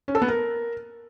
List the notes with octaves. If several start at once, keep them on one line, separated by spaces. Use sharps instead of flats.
C#4
A4
B3
A#4